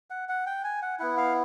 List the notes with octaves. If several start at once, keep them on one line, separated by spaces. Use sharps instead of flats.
F#5
F#5
G5
G#5
F#5
B3 E4 F#5
F5